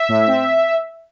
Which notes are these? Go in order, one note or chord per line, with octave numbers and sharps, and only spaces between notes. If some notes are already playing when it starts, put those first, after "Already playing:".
Already playing: E5
A2
C4